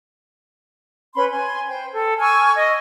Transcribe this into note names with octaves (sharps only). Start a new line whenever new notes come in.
C#4 B4 B5 C6
G#5 C6
C5 G5
A4
G#5 C#6 E6 F6
D#5